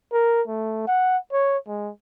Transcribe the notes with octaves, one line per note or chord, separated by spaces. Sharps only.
A#4
A3
F#5
C#5
G#3